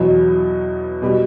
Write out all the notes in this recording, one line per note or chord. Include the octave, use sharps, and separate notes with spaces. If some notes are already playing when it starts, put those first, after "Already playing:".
Already playing: E2 B2 F#3
B2 G3